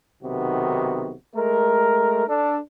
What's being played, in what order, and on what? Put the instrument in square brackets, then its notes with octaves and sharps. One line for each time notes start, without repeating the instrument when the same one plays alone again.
[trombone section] B1 C3 D#3 B3 F#4
G#3 A3 A#4
D4 A4